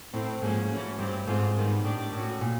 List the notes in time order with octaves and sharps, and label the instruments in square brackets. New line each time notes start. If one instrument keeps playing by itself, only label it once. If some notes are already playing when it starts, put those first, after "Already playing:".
[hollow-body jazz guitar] A2 [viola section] C4 E4 A4
[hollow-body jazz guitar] G#2 [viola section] F3 A#3 C#4
[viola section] E3 A3 C#4 F#4
[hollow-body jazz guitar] G2 [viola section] C4 E4 G4
[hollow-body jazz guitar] G#2 [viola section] G#3 C4 F4 A4
[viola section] D#3 G3 B3
[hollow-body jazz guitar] A2 [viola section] A3 D4 G4
[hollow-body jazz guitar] A2 [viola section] A3 C#4 F#4
[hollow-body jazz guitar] A#2